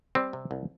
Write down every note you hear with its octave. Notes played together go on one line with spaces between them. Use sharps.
G3 C4
C3
C2